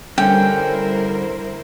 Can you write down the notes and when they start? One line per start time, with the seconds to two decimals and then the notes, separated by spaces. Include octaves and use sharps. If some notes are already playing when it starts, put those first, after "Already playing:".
0.18 G2 D3 G3 C#4 E4 A#4 C5 G5